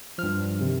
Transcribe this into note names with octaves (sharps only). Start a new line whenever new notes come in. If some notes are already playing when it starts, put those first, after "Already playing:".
G2 F3 F6
C3 D#3